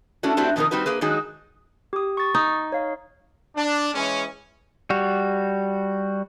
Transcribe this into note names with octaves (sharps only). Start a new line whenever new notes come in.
A3 C#4 D4 E4 F#4
A3 C4 D4 E4 F#4 G4
F2 B2 D#3 A#3 D#4 A#4
G3 C4 D#4 F#4 B4
A#3 G#4 B4
D#3 F#3 G#3 D#4 F#4 G#4
G4 D#6
C#6 A6
D#4
C#5 F5
D4
E3 G#3 C#4
G3 F#4